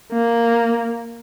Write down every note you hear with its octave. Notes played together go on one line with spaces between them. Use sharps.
A#3